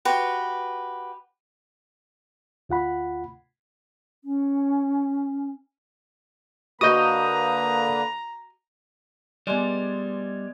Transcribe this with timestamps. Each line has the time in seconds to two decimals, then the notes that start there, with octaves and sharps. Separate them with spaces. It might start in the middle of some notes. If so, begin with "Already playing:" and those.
0.05 F#4 G4 B4 C6
2.69 D2 F4 F#5 B5
4.24 C#4
6.81 D3 A#3 F#4 B4 D#5 A#5 D#6 G6
9.47 G3 G#3 B3 D5 G#5